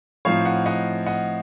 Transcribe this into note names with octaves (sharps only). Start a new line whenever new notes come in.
A2 F3 C4 D#4 C#5 F5
D#5 F#5
D#5 F#5
D#5 F#5